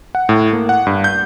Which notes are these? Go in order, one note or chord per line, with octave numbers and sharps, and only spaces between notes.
F#5
A2
A#3
F#5
G2
G6